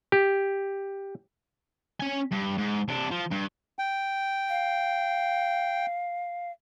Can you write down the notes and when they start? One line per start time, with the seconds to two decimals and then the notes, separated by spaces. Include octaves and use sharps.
0.12 G4
2.00 C#4 G#5
2.32 G2
2.58 G#2
2.88 C3 D4
3.11 F3
3.31 G2
3.79 G5
4.49 F5